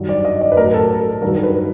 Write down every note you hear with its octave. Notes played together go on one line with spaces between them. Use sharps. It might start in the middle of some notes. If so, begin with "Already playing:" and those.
Already playing: G2 D#3 F#3
D5
D#5
D5
B4
A2 F#3 A#4
A4
A#4
A4
G2 D#3 F#3 A#4
B4